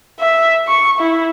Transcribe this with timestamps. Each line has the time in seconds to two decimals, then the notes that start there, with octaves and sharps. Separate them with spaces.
0.20 E5
0.68 C#6
0.99 E4